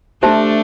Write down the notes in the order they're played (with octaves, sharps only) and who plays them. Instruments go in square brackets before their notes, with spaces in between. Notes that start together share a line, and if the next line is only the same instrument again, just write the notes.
[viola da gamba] A3 D4 [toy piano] G4 C5 E5 A5